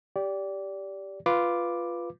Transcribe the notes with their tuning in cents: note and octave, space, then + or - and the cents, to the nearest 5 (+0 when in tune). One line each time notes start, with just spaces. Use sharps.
G4 +0 D5 -20
F4 -5 B4 +0 D6 +0